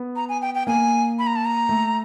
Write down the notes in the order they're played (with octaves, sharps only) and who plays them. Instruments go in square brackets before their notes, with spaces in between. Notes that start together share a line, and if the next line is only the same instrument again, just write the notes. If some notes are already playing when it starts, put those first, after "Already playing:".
Already playing: [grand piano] B3
[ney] A#5
G#5
G5
G5
[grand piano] A#3 [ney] G#5
[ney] B5
A#5
A5
A#5
[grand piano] A3